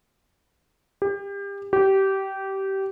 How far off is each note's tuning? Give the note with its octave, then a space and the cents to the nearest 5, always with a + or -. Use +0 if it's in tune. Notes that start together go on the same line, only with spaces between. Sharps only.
G4 +30
G4 -20